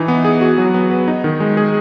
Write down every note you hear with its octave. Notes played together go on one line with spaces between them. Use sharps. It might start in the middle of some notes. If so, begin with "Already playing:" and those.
Already playing: E3 D#4
B3
G#4
F#4
F#3
B3
B4
D#4
D#3
G#3
G#4